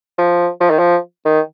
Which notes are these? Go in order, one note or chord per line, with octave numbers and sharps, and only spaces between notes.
F3
F3
D#3
F3
D#3